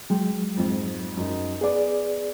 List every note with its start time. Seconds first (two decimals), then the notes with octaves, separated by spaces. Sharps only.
0.10 F#3 G#3 G5
0.57 F2 G#2
1.17 F#2 D#4
1.61 B3 G#4 D5 D6